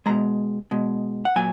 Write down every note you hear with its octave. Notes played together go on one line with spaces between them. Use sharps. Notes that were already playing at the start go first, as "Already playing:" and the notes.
B2 G#3 A#5
B2 G#3
F#5
A#2 F#3 G#5